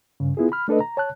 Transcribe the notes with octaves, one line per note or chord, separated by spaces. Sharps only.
G2 C#3
B3 E4 F4 G#4
B5 F6
A3 D4 A4 B4 D#5
A#5
C#5 A5 F#6